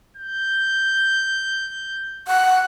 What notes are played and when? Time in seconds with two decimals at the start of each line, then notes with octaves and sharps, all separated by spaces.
0.17 G6
2.28 F#5